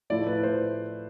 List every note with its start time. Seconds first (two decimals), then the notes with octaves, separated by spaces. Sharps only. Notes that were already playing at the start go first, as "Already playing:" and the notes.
0.10 A2 F3 A3 E4 D5
0.27 B4
0.43 C5